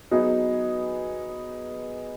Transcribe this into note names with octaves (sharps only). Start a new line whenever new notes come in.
F#3 B3 D#4 G#4